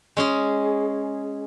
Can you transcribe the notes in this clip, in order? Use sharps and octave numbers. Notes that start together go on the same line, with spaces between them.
G#3 C#4 G#4